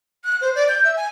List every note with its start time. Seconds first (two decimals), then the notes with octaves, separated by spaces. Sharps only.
0.24 F#6
0.41 C5
0.56 D5
0.68 G6
0.84 E5
0.96 G#5